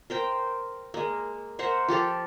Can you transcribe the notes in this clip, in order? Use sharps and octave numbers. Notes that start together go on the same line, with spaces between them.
A#4 C5 G5
G#3 A#3
A#4 C5 E5 F#5
F3 G4 A4 F5